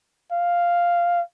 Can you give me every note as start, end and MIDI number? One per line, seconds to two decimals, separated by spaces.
0.32 1.21 77